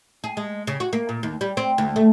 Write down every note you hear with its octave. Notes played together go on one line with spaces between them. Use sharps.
G#4
G#3
C#3
F#4
A#3
A#2
D#2
G3
C4
D2
A3